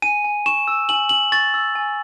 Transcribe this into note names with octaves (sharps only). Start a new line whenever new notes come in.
G#5 D#7
G#5
C#6 E7
E6
G#5 F#7
G#5 F#7
C#6 A6
E6
G#5